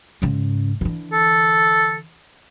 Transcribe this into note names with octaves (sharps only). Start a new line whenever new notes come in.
G#2 C#3
D3 E3
A4